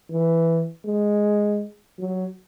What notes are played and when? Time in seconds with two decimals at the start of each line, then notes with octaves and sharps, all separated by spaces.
0.10 E3
0.86 G#3
1.99 F#3